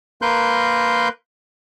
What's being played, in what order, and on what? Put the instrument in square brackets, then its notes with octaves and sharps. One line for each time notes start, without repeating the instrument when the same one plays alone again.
[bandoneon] A#3 A#4 B4 C6 F#6 G6